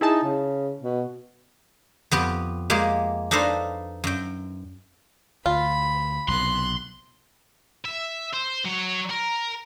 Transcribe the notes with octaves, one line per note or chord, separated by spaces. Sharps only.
D#4 E4 G#4 A5
C#3
B2
F2 B3 G4
G#3 A#3 G4 G#4
D4 D#4 A4 B4 C5 F5
F#2 G5
D2 F4 B5
B1 C3 C6 F#6
E5
C5
F#3 C#5
A#4